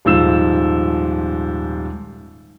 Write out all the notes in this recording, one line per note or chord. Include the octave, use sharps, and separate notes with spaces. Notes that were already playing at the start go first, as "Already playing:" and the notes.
D#1 G#2 F3 E6 E7